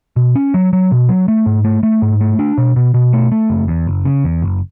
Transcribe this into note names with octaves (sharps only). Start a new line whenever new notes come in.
B2
C#4
F#3
F#3
B2
F#3
A3
G#2
A3
A3
G#2
A3
D4
B2
B2
B2
A3
A3
F#1
E2
F#1
C#3
E2
F#1